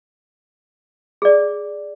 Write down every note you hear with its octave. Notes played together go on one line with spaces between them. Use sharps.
G#4 D5